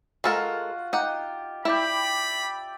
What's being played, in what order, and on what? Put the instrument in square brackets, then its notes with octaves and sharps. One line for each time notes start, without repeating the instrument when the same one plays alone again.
[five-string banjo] G#3 A4 A#4 [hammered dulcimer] F4 F#4 F#5
[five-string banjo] D#4 F#5 [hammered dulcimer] G4
[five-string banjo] E4 [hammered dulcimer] G4 D5 E5 [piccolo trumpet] B5